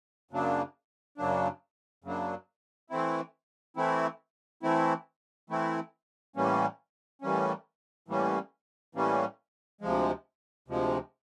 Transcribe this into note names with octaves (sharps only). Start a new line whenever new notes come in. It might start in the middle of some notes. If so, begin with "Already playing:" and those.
F#2 C#3 F#3 A#3 D4
F#2 C#3 F#3 A#3 D4
F#2 C#3 F#3 A#3 D4
E3 A3 C4 E4
E3 A3 C4 E4
E3 A3 C4 E4
E3 A3 C4 E4
A2 E3 G3 A#3 C#4
A2 E3 G3 A#3 C#4
A2 E3 G3 A#3 C#4
A2 E3 G3 A#3 C#4
D2 C3 F3 G#3
D2 C3 F3 G#3